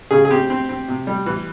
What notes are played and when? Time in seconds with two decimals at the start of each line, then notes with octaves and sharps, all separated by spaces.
0.11 C#3 G#4
0.25 G#4
0.30 C4 G4
0.50 C4
0.69 C4
0.88 C3
1.07 G3
1.26 E3